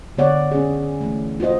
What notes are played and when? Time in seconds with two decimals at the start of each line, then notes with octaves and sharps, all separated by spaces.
0.17 D3 B3 C#5 D5 F#5
0.51 C#4 G#4
1.01 E3 A3
1.40 F4 F#4 C5 D#5